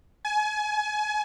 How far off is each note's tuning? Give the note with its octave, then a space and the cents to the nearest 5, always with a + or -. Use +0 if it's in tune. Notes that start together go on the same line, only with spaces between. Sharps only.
G#5 +30